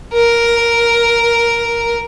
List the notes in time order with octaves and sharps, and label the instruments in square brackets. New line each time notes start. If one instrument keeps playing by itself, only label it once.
[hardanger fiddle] A#4